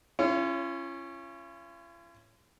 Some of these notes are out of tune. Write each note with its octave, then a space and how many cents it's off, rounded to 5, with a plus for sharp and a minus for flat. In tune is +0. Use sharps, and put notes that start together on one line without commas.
C#4 -10 F4 -45